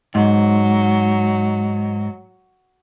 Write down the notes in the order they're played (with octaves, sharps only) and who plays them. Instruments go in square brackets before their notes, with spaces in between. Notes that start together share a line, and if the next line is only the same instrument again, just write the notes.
[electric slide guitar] G#2 [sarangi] F#3